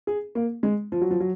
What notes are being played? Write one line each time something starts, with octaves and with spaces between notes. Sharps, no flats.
G#4
A#3
G#3
F3
F#3
F3
F#3